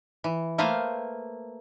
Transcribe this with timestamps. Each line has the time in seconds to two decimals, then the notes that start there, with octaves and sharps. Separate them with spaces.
0.24 E3
0.58 A3 A#3 B4 C5 F5